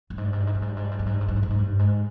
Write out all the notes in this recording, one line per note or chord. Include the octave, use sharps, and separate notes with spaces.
G2
G#2
G2
G#2
G2
G#2
G2
G#2
G2
G#2
G2
G#2
G2
G#2
G2
G#2
G2
G#2
G2
G#2
G2
G#2